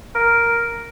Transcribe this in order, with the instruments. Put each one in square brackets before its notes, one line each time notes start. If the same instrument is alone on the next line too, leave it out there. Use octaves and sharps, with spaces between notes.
[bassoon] A#4